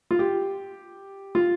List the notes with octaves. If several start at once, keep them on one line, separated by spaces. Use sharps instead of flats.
F4
G4
F4